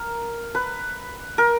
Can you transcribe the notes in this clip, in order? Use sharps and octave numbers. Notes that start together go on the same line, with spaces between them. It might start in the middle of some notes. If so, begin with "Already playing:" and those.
Already playing: A#4
B4
A#4